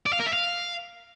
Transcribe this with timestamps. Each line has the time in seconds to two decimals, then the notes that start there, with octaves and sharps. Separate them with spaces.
0.06 D5
0.13 F5
0.20 A#4
0.26 E5
0.33 F5